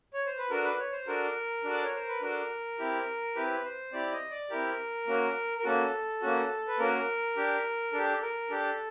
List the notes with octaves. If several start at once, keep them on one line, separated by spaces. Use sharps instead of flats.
C#5
C5
B4
D4 F#4 A4 A#4
B4
C#5
C5
D4 F#4 A4 A#4
D4 F#4 A4 D5
C#5
C5
B4
D4 F#4 A4 A#4
C4 E4 G4
C4 E4 G4 B4
C5
C4 E4 G4 D5
D#5
D5
C4 E4 G4 A#4
A#3 C#4 F#4
A#4
A#3 C#4 F#4 A4
A#3 C#4 F#4
B4
A#3 C#4 F#4 A#4
D4 G4
D4 G4 A4
A#4
D4 G4 A4